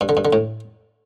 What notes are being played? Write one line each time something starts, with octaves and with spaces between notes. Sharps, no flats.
G2
D3
G2
D3
A2